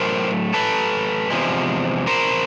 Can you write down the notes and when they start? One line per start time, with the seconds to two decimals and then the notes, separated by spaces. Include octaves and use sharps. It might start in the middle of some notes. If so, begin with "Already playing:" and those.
Already playing: A2 F#3 A3 A#4 C5
0.54 A4 B4
1.31 E2 C3 F3 G#3
2.07 A#4 C5